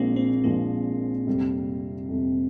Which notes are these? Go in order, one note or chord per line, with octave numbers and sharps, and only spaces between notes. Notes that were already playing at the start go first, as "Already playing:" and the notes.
Already playing: A#1 A#2 F3 G#3 A#3 C4
C4
A#1 A#2 F3 G#3 A#3
F2 C3 G3
F2 C3 G3